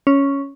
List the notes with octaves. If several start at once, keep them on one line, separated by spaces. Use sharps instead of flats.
C#4